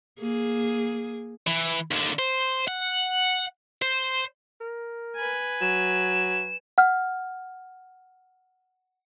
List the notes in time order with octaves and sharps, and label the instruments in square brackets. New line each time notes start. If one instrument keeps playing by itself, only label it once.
[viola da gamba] A#3 G#4
[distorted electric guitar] E3
D#2 D3
C5
F#5
C5
[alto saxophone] A#4
[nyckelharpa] B4 G#5
[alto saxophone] F#3 [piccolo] E7
[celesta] F#5 F6